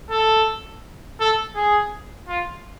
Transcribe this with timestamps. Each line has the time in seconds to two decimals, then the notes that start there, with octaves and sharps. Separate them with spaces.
0.11 A4
1.20 A4
1.56 G#4
2.28 F4